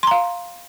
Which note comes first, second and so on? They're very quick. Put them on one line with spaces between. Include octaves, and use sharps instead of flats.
C6 A#5 F5